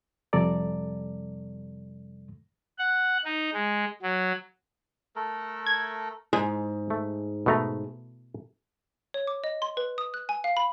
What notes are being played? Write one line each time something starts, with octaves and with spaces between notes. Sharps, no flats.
F2 C3 G3 A4 D5 A#5
F#5
D#4
G#3
F#3
A3 A4 A#4
G#6
G#2 G#3
A3
B2 A3 A#5
C#5
D6
D#5
C6
B4
D#6
F#6
G#5
F5
B5